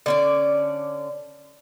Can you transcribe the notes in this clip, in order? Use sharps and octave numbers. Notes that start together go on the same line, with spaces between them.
D3 C#4 D5